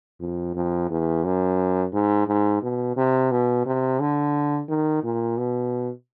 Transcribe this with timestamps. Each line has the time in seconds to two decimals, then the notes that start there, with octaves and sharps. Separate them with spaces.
0.20 F2
0.55 F2
0.90 E2
1.24 F#2
1.93 G#2
2.27 G#2
2.62 B2
2.96 C3
3.31 B2
3.66 C3
4.00 D3
4.69 D#3
5.04 A#2
5.38 B2